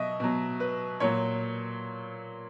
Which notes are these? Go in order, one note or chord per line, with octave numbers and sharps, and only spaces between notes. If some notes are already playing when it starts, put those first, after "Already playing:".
Already playing: B2 F#3 D#5 E5
B2 F#3
B4
A#2 F#3 C#5